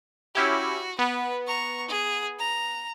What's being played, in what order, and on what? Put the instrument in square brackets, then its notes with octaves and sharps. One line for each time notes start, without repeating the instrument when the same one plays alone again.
[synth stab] C#4 E4 G4 [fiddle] F#4
[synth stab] B3 [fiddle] B4
[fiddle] A#5 C#6
G#4
A#5